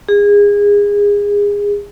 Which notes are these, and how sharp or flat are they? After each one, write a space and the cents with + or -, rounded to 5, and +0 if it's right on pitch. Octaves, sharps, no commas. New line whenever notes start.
G#4 -25